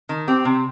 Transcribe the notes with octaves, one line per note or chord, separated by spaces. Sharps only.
D#3
C4 G4
C3